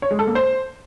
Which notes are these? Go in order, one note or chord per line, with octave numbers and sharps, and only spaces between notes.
C#5
G#3
A4
A#3
C5